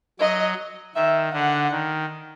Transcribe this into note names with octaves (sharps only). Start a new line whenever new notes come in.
F#3 D#5
D#3 E5
D3 F#5
D#3